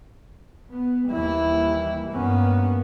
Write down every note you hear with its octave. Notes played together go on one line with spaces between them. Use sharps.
B3
D#2 E3 G3 E4
G2 A#3 B3 C#4